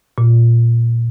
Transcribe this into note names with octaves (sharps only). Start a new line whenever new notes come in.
A#2